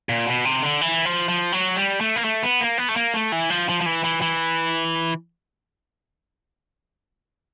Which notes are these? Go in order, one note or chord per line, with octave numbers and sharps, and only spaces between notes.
A#2
B2
C3
D3
E3
F3
F3
F#3
G3
A3
A#3
A3
B3
A#3
B3
A3
A#3
A3
E3
F3
F3
F3
E3
E3
E3